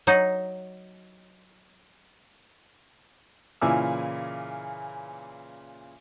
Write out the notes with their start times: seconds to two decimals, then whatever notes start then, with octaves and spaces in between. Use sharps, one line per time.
0.07 F#3 D#4
3.61 A#2 C#3 E3 G#5 D6 E6